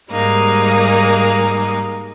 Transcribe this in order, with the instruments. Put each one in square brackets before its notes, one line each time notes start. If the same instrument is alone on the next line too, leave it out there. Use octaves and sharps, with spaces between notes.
[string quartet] G#2 G3 G#3 A#3 D#4